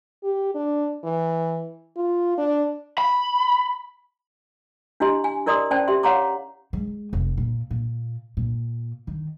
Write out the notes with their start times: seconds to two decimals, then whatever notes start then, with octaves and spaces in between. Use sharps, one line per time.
0.24 G4
0.55 D4
1.04 E3
1.97 F4
2.38 D4
2.98 B5
5.00 D4 E4 G4 D#5 C6
5.24 G#5
5.46 E4 A#4 D5 D#5 C6 D#6
5.71 C#4 C5 D5 G5 A5
5.88 G4 E5 C6
6.03 C#5 F5 F#5 A#5 C6 D6
6.73 G#3
7.13 F1
7.37 A#2
7.71 A#2
8.37 A#2
9.07 D#3